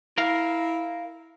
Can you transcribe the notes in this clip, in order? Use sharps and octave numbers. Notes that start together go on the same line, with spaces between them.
E4 A#4 F5